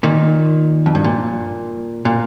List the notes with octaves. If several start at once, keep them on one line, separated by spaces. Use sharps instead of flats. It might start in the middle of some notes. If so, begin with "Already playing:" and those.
A#2 D#3
F2
G2
A#2
A#2